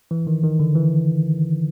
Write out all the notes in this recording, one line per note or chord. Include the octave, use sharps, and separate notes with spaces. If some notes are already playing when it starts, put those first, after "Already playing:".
E3
D#3
D#3
D3
E3